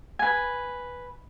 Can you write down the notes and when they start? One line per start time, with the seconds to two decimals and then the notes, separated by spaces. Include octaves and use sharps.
0.19 B4 G#5